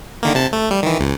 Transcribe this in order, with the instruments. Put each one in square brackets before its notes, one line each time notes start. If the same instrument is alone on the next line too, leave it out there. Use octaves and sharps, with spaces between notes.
[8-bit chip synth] D3 D#3 A#3
C3 A5
A3
G3
D#3 E3
C#2